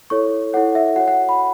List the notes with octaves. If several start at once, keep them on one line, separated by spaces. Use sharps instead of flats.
E4 A4 C#5 C#6
E4 A4 C#5 F#5
E5
F#4 C#5 F#5
F#5
B5